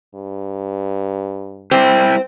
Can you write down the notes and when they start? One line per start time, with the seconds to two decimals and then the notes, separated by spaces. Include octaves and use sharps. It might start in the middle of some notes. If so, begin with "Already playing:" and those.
0.15 G2
1.71 G3 C4 E4 G4